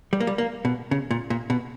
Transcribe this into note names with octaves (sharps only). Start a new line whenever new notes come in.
G3
A#3
G3
A#3
B2
C#3
A#2
A#2
B2